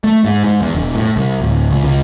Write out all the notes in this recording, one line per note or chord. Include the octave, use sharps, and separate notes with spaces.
A3
G#2
G#2
E2
E1
A2
C2
D1
C#2
C#2